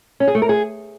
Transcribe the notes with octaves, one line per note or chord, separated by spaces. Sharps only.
C#4
G#4
A3
A#4
G#4